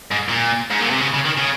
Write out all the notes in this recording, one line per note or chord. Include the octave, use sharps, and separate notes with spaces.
G#2
A#2
G#2
A#2
C3
C#3
C#3
D#3
C#3